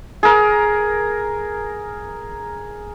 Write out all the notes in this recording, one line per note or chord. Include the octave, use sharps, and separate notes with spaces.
G#4 A#4